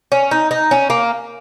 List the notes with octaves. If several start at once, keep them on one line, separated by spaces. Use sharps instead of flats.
C#4
D#4
D#4
C#4
A#3